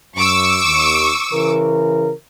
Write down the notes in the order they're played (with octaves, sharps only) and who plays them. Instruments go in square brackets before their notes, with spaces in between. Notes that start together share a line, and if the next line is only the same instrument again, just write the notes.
[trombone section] F#2 [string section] C#6 D6 E6
[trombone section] D#2
C#3 E3 A#4